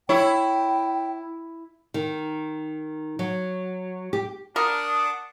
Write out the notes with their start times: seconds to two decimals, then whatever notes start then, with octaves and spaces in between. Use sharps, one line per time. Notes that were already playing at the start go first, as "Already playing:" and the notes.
0.09 E4 C#5 G5
1.94 D#3
3.19 F#3
4.13 G4
4.56 D4 A#4 F#5 A5 D6 D#6